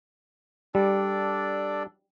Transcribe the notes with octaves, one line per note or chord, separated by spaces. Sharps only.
G3 D4 A4 D5